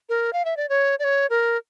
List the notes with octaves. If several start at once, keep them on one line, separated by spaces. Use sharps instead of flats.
A#4
F5
E5
D5
C#5
D5
C#5
A#4